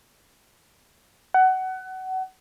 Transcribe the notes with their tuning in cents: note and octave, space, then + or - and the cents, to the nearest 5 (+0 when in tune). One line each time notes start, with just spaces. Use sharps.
F#5 +25